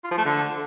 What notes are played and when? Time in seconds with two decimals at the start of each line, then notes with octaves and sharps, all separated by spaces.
0.04 F4
0.11 F3
0.18 A3
0.25 D3